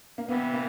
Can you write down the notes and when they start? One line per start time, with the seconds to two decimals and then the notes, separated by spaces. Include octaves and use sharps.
0.18 A#3
0.28 C3 E3 G3 B3
0.54 A#3